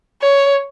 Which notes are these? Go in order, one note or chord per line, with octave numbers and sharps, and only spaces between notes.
C#5